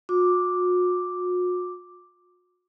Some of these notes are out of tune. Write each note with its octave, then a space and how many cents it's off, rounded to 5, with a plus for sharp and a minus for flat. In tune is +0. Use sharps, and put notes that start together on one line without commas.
F#4 -45 D6 +0